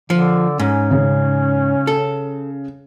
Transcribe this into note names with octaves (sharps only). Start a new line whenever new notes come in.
D3 F3
G#2 C#4
C#3
A4